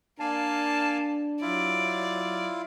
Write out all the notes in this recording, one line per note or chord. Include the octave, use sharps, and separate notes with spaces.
A#3 D4 D5 F5 G#5 A5
F#3 E4 F4 D5